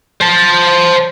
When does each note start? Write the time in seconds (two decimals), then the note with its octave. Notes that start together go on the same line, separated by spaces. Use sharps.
0.21 C5 A5